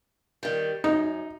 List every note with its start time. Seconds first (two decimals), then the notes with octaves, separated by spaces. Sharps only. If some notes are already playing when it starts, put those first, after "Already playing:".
0.43 D#3 G3
0.84 F#2 D#4